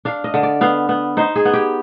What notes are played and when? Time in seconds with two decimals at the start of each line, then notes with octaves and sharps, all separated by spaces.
0.05 D4 F5
0.24 D#5
0.34 D3
0.43 D5
0.61 B3 F5
0.89 B3
1.17 D#4 C5
1.36 G#4
1.45 B3
1.53 G4